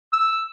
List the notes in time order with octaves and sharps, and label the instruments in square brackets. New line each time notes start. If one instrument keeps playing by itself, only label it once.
[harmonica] E6